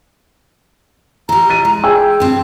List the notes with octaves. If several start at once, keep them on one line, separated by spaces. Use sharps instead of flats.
E3 G3 A#5
A6 D#7
G#3
G#4 G5 G#5 E6
G2 C4